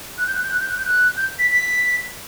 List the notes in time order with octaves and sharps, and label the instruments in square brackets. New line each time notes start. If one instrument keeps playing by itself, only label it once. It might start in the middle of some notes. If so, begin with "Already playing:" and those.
[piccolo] F#6
G6
F#6
G6
F#6
G6
F#6
G6
F#6
G6
B6
B6